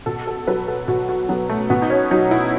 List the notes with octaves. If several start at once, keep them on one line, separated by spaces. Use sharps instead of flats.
B2 A4
A4
F#3 B4
A4
B2 F#4
F#4
F#3 B3
A3
B2 B3
D#4
C#4
F#3 D#4
E4